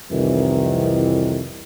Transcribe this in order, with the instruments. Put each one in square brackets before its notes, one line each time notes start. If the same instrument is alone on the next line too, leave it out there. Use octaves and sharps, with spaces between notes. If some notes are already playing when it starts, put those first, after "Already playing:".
[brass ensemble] C2 F2 D#3 E3